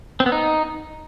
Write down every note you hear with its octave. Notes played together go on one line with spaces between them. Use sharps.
C4
B3
D#4